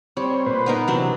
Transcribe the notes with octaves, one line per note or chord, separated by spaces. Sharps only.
G3 C4 C#5
A#2 B4 C5
B3 D#4 A#4
C3 E3 F#3 C4 D4